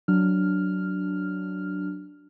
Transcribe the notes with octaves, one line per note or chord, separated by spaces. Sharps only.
F#3 D4 F6